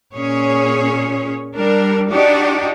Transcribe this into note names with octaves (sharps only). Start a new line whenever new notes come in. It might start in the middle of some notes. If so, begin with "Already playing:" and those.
A#2 C#4 G#4 C#5
G3 D4 A#4
D4 D#4 F#4 G4 D5